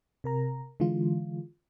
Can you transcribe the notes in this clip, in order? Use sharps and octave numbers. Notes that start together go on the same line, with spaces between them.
C3 A#4 A#5
D3 E3 G#3 F4